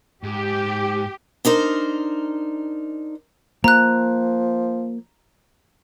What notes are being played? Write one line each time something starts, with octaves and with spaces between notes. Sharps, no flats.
G#2 G4
D4 D#4 A#4 C5
F3 A#3 A#5 F#6